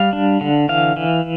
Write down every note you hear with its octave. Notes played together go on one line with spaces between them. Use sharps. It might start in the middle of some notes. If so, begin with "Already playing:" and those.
Already playing: G3 F5
D4
D3
E3 F5
E3